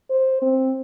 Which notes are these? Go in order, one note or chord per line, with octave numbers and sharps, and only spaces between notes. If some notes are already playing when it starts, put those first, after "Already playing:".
C5
C4